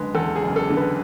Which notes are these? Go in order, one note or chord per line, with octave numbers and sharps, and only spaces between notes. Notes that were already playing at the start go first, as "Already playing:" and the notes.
Already playing: F#1 D3 G#3 B4
E2 A4
G#4
F#1
A4
D3
B4